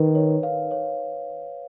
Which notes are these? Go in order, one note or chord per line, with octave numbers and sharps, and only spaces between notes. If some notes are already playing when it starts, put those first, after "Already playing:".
Already playing: D#3 B4
C#5
F5
C#5